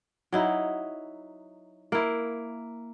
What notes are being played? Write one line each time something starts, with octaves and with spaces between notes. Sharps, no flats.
F#3 D#4 E4
A#3 E4